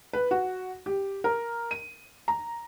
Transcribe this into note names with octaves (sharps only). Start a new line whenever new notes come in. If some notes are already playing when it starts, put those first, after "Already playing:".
B4
F#4
G4
A#4
D#7
A#5